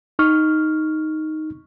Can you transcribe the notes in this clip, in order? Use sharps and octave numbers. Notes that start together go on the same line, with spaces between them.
D#4 C#6 F6